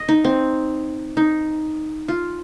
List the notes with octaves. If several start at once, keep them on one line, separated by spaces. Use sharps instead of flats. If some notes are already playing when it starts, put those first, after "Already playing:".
Already playing: D#5
D#4
C4
D#4
F4